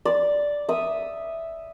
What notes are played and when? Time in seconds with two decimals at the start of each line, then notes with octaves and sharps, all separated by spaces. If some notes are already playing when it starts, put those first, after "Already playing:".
0.05 D5
0.69 E5 D#6